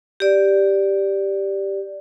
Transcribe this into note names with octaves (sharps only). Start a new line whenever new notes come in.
G4 D5